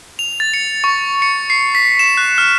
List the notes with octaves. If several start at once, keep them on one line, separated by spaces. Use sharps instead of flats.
F7
A6
C#7
C#6
C#7
C7
B6
E7
F#6
F6